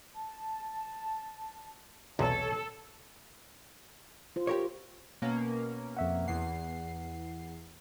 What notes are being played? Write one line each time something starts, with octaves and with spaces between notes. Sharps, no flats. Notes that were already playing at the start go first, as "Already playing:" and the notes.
A5
B1 E2 C3 A4 C#5
F4 C5
G4 A#4 C#5
B2 A#3 C#4
F2 E5 F#5
E2 F#5 C7